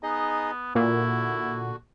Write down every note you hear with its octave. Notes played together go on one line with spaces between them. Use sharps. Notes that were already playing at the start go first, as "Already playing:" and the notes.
B3 D#4 G#4 D#5
A#2 D3 E4 F#4